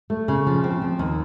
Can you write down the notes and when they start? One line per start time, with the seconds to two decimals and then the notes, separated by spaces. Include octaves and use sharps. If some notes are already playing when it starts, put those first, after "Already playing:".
0.10 A3
0.28 C#3
0.47 F3
0.64 C4
0.82 F3
0.99 D#2